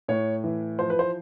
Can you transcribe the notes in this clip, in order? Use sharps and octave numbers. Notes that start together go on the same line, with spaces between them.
A2 C#5
E3
F3 C5
B4
C5